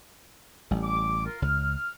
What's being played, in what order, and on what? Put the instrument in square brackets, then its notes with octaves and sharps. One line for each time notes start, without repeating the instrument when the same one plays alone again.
[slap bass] A1 G3
[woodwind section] D6
F4 A#4
[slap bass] C#2 [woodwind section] F6